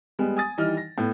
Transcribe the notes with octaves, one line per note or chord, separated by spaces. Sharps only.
G3 G#3 B3
G#5 D#6 A6
D#3 E3 G3 D#5 F6
A#6
A2 B3